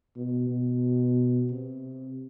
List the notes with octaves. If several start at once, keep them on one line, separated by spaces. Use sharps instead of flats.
B2
B2
C3